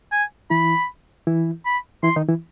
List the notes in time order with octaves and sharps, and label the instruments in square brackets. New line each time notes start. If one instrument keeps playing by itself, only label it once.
[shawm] G#5
[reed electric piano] E3 E4 [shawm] B5
[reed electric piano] E3 E4
[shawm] B5
[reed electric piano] E3 E4 [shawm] C6
[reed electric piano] D#3 D#4
E3 E4